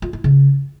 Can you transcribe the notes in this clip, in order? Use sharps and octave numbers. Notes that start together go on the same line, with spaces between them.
F4
E4
C#3